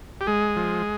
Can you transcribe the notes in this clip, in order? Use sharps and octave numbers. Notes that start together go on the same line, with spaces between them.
G4
G#3 G#4
F3